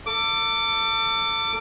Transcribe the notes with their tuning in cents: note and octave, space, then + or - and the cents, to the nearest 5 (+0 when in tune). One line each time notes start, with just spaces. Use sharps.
A4 +40 D6 +0